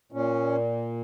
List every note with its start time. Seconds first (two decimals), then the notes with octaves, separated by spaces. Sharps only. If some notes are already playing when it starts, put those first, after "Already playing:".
0.12 A#2 C#4